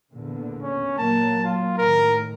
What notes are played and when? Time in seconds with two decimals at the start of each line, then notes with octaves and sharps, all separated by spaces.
0.12 E2 A#2 D3
0.62 C#4
0.98 A#2 F#3 A#3 A5
1.45 F4
1.78 A2 D#3 A#4